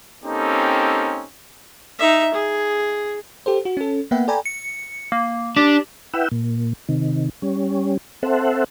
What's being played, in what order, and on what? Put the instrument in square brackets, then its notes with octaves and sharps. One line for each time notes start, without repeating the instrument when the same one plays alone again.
[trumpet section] A#3 C4 C#4 D#4 G4 A4
[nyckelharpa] D#4 E5
G#4
[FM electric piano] G4 A4 C5
F#4
C#4 A4
A#3 B3 B4 E5 F#5 G5
A4 D5 G5 G#5 A#5 B5
[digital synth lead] C#7
A#3
[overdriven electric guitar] D4 [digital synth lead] G4
[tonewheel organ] E4 B4 F#5 G5 E6
A#2
C3 D#3
G3 C#4
C4 A4 C5 E5 F#5